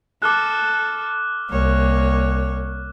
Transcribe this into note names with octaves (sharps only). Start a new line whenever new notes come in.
A4 D6 F6 F#6
C2 A#3 C#5